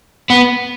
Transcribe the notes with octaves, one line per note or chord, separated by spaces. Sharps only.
B3